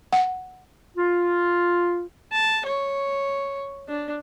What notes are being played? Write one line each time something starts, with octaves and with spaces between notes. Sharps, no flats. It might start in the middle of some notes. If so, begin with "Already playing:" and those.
F#5
F4
A5
C#5
D4